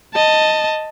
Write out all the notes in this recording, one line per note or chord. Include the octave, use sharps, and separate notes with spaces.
D#5 A5